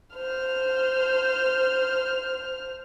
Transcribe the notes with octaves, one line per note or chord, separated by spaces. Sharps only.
C5 F6